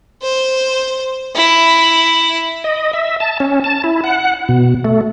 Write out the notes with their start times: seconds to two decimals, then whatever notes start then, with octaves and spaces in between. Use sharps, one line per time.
0.22 C5
1.35 E4
2.64 D#5
2.93 E5
3.20 A5
3.40 C#4
3.64 A5
3.84 E4
4.04 F#5
4.49 B2
4.85 A3